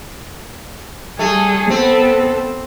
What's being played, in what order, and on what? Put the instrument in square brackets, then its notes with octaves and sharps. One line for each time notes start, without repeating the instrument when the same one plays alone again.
[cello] G3 G#4 [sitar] A3
[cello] B3 A4 [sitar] C4